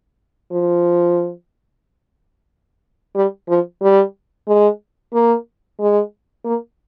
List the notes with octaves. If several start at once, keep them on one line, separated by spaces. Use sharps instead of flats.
F3
G3
F3
G3
G#3
A#3
G#3
A#3